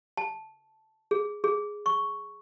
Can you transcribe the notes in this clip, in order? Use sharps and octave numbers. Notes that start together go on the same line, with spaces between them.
A5
G#4
G#4
C#6